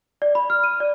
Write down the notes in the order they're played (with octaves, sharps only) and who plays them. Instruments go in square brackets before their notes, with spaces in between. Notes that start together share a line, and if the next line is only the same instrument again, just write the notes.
[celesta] D5
B5
F6
D#7
D5